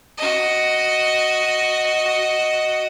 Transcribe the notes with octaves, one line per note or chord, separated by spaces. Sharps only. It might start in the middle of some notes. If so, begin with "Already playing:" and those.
F#4 D#5